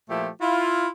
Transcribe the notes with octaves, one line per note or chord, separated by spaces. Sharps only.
A#2 F3 A3 E4 G4
E4 F4